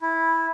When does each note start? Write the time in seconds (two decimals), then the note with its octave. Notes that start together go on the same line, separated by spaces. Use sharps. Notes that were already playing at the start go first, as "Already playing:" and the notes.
0.02 E4